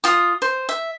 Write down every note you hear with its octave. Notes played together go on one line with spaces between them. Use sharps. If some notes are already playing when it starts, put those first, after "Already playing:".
F4 D#6
C5
E5